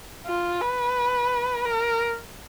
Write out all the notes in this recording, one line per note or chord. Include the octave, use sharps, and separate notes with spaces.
F4
B4
A#4